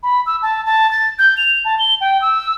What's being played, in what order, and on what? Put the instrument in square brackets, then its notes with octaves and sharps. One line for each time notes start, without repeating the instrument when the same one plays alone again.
[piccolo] B5
E6
A5
A5
A6
G6
F7
A5
G7
G5
E6